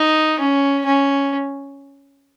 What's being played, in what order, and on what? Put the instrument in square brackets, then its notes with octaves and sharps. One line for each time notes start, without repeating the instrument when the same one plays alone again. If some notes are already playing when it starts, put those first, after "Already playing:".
Already playing: [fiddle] D#4
C#4
C#4